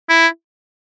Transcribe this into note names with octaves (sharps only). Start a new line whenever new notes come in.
E4